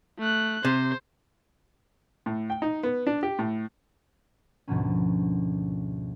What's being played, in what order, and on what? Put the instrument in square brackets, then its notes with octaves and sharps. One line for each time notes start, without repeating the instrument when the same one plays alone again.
[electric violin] A3 F#6
[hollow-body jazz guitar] C3 [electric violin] C5
[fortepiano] A2
G5
D#4
B3
D4
G4
A2
[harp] D2 G#2 B2 F3 A#3 C#4